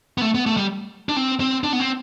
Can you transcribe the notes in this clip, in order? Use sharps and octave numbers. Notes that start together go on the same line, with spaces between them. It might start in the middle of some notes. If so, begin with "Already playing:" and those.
B3
A3
B3
A3
G3
D4
C4
C4
D4
B3
C4